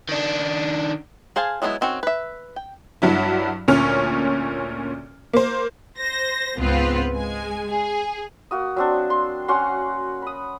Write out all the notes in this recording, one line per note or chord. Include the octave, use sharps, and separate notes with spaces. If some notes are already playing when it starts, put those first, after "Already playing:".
D#3 D4
G#4 C5 F5 G#5 A5
F#3 G#3 B3 D4 E4
D#3 C4 C#4 F#4
B4 E5
G5
G2 F#3 E4
D2 A#2 C#4 F6
A#3 C5
C5 A#6
C#2 G#2 B3 C4 F4 B4
G#3 G#5
G#4
A#3 F#4 D#6
F#3 C4 D4
C6
C#4 F#4 F#5 C6
B5 D#6